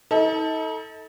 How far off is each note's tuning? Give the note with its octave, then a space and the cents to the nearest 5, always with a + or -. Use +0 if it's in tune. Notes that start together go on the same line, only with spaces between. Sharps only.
D#4 +40 A4 +0